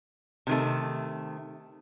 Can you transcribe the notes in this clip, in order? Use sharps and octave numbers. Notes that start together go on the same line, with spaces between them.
C3 D#3 A3